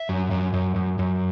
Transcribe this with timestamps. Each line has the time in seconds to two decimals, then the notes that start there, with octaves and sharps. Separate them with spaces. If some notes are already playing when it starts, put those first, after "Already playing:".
Already playing: E5
0.09 F#2
0.31 F#2
0.54 F#2
0.76 F#2
0.99 F#2